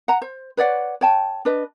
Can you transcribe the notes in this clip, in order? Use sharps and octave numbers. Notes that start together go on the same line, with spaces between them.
F#5 A#5
C5
B4 C#5 D5 F#5
C#5 G5 A5
D4 B4 D#5